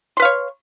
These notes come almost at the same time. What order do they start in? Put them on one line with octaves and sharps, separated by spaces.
C6 B4 F5 C#5